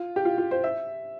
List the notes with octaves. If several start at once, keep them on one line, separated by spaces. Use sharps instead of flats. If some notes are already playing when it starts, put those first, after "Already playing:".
Already playing: F4
G4
F4
F4
C5
E5